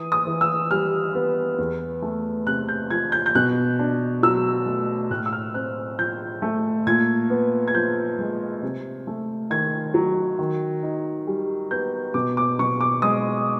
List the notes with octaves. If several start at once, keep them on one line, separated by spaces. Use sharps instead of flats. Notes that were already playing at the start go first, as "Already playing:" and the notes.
Already playing: E3 D#6
D#6
E3
E6
G3 F6
B3
E2
A3
C3 F#6
G6
F3 G#6
G6
G6
B2 F#6
D4
F#3 E6
A3
A2 F#6
F6
E6
F6
C4 F#6
F3 G6
A3
A#2 G#6
B3
G#6
F3 G6
G#3
C3
A3
D#3 G#6
F#3
D#3
D#4
G3
B3 G6
B2 D6
D6
B2 C#6
D6
G#3 D#6